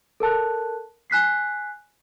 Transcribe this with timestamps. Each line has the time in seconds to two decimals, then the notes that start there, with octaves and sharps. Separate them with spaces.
0.20 A4 A#4 A5 F#6
1.10 G#5 F#6 B6 C7